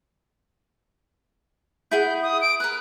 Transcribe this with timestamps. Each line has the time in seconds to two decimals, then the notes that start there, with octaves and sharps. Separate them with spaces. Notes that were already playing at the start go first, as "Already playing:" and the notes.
1.91 E4 G#4 F#5 G6
2.23 D#6
2.41 D7
2.60 A#4 B4 F#6